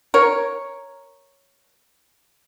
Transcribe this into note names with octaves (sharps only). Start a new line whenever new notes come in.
A#4 C#5